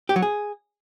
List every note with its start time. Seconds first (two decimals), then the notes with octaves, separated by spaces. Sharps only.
0.09 G4
0.16 F#3
0.22 G#4